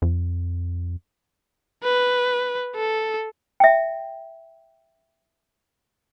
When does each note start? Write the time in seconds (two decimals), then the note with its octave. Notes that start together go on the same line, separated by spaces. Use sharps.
0.02 F2
1.84 B4
2.75 A4
3.60 E5 G5